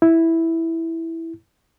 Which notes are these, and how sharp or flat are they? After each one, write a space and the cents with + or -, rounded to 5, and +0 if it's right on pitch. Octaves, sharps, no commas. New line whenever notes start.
E4 -5